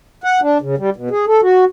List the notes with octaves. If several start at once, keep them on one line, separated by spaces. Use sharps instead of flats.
F#5
D4
C#3
G3
B2
G#4
A4
F#4